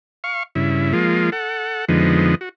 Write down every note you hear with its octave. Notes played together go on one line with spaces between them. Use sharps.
F5 C#6
G2 C#3 E4
F3 G#3 A#3 F4
A4 F#5
F2 D3 F3 G#3 B3 D#4
F#4